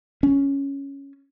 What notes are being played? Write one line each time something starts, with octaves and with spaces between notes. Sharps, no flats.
C#4